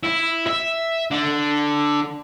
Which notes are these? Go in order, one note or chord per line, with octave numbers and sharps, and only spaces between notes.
E4
E5
D3